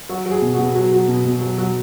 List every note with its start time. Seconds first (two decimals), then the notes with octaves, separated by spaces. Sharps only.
0.09 F#3 F#4
0.26 F#3
0.31 G#4
0.42 B2
0.54 F#4
0.59 B2
0.75 F#3
0.92 F#3
1.08 B2
1.25 B2
1.41 F#3
1.58 F#3